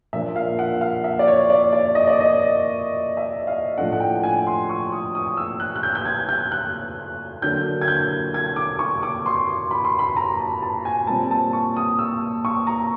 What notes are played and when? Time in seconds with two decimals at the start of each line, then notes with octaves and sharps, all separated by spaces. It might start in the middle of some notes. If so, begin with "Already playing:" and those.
0.13 A#2 F3 A#3 D4 E5
0.36 F5
0.59 F#5
0.81 F5
1.04 E5
1.19 D5
1.28 C#5
1.50 D5
1.73 D5
1.95 D#5
2.07 D5
2.21 D#5
3.17 E5
3.47 F5
3.78 A2 F3 A3 D4 F#5
3.93 F#5
4.00 G5
4.23 G#5
4.47 C6
4.69 C#6
4.92 D#6
5.15 D#6
5.37 E6
5.60 F#6
5.76 F#6
5.83 G6
5.95 G6
6.05 G#6
6.29 G6
6.52 F#6
7.42 D3 F#3 A#3 D4 G6
7.81 G#6
7.88 G6
8.34 G#6
8.56 D6
8.79 C#6
9.03 D6
9.26 C6
9.71 B5
9.84 C6
9.99 B5
10.16 A#5
10.40 A5
10.62 A5
10.85 G#5
11.07 A#2 G3 C4 A5
11.31 A5
11.53 C#6
11.76 D#6
11.99 E6
12.45 C#6
12.67 A#5